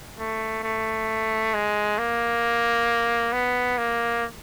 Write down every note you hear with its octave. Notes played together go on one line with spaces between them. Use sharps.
A3
A3
G#3
A#3
B3
A#3